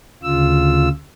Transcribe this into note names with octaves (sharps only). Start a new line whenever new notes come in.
D2 C#3 F4 E6